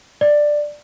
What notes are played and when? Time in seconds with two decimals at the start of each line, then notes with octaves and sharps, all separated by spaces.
0.21 D5